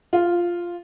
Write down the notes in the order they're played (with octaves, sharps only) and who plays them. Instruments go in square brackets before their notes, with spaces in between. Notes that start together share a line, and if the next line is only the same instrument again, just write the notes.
[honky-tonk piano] F4